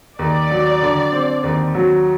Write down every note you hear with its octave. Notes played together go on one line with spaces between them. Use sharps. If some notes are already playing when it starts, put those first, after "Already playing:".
D#2 D5
F#3
D3
C4
D#2
F#3